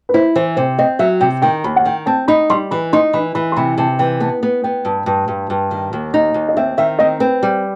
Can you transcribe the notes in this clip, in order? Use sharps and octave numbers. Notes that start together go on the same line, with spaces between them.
B4
E4 C5
E3 C5
C3 C5
C4 D#5
F#3 E5
C3 G5
D#3 G5
D#2 B5
F#5
D#3 G5
C4 A5
D#4 B5
G3 C6
E3 B5
D#4 C6
E3 B5
E3 B5
C6
C3 B5
C3 A5
E3 G5
B3 A5
B3
B3 G5
G2
G2
G2
G2
D#3
D#2
D#4
D#2
D#5
C4 E5
D#3 E5
C4 D#5
C4 B4
G3